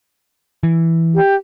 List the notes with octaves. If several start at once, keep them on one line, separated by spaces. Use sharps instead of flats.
E3
G4